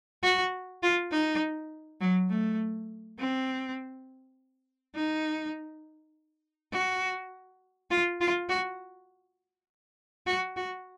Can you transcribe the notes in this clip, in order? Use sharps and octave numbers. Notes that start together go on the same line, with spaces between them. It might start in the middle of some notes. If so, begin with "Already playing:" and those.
F#4
F4
D#4
F#3
A3
C4
D#4
F#4
F4
F4
F#4
F#4
F#4